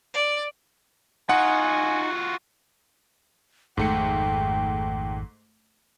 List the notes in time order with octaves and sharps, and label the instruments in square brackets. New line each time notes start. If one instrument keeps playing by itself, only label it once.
[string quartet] D5
[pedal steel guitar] D#4 [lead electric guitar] F4 F#4 [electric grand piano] F#5 [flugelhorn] G#5
[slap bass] G#1 F2 [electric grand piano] G#2 A3 C#7 [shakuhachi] G5